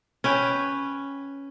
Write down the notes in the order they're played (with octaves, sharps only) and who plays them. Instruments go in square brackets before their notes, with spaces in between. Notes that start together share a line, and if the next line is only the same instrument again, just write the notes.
[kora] C#4 B4 G5